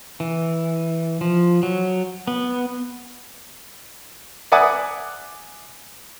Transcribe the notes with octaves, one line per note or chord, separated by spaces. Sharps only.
E3
F3
F#3
B3
D5 E5 F#5 G#5 D6 D#6